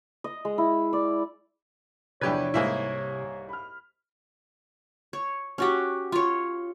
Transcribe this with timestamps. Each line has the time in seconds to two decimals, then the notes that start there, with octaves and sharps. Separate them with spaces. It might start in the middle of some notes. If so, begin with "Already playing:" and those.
0.24 D#5
0.45 G#3
0.58 E4
0.93 D5
2.21 E2 C3 F3 D4 G4 B4 C#5 G#6
2.54 C2 G#2 A#3 E4 G#5 B6
3.49 B5 F6
5.13 C#5
5.58 C#4 F#4 G4
6.12 F4 C#5